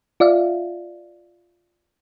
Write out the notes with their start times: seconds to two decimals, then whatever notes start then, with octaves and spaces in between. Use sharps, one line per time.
0.20 F4 D5 E5 F5